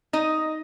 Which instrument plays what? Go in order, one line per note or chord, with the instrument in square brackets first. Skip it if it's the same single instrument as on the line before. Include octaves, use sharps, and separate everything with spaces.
[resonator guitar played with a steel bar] D#4 D#5